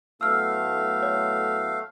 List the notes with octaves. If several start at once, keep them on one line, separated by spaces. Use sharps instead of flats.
A2 F#3 A3 B3 F5 E6 F6
C#5